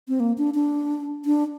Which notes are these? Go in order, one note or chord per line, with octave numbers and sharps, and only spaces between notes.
C4
A#3
D4
D4
D4